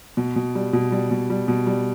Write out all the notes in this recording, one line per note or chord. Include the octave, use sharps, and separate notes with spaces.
B2
B2
G3
B2
G3
B2
G3
B2
G3